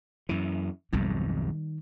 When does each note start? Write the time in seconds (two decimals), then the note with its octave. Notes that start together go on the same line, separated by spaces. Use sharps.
0.29 F#2 E3
0.93 B1 F2 G#2 D#3 G3